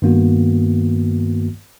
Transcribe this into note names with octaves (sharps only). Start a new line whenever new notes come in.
G2 D#3 A#3 B3 F#4